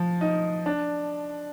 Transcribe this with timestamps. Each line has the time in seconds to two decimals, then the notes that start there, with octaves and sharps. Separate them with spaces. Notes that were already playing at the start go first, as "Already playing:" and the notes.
Already playing: F3
0.21 D#4
0.66 D4